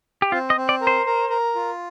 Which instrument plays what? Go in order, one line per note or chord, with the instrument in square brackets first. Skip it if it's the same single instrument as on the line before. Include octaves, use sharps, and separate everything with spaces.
[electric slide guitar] G4
[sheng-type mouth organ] C4 [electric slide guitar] F4
[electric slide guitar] D#5
[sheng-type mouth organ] C4
[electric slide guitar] D5
[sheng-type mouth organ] A#4
[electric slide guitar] C5
[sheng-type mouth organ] A#4
A#4
F4